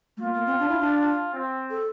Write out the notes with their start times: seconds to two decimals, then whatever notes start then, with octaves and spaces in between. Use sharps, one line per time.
0.17 A3
0.21 A#3 F4
0.34 A#3
0.46 C4
0.59 D4
0.69 E4
0.80 D4
0.96 F4
1.33 C4
1.71 A4